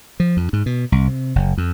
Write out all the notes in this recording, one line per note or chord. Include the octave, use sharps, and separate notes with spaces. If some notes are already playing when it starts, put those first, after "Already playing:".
F3
F2
G#2
B2
C2
C3
F#1
F2